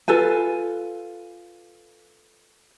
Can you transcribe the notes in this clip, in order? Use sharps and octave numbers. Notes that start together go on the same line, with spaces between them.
F4 A4 B4 G#5